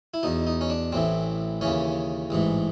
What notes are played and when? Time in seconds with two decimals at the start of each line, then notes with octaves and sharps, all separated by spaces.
0.14 E4
0.23 E2 B2 D#4
0.47 D#4
0.61 C#4
0.70 D4
0.92 A1 A2 E3 C4
1.61 D#2 C#3 E3 C#4
2.30 A1 G#2 E3